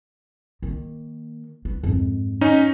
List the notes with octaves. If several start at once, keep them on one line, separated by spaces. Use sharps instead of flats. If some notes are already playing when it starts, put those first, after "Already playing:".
D#3 A#3
B3
F2 G#2
C#4 D#4